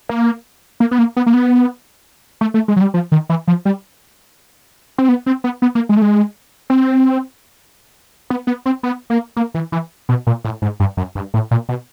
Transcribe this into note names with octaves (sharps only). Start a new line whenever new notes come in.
A#3
A#3
B3
A#3
B3
A#3
B3
A3
A3
G#3
F#3
G3
F3
D#3
E3
F3
G3
C4
B3
C4
B3
B3
A#3
G#3
A3
G#3
C4
B3
B3
C4
B3
A#3
A#3
E3
E3
B2
A#2
A2
G#2
G2
F#2
G2
A2
A#2
B2